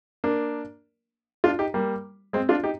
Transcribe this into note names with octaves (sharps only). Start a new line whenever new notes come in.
A#3 D4
D4 F4
D#4 G4
G3 A#3
G#3 C4
D4 F4
D#4 G4